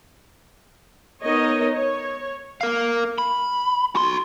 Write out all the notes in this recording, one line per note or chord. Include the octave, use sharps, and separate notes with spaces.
B3 D#4 A#4 C#5 D#5
C#5
A#4 F5
B5
F#4 C6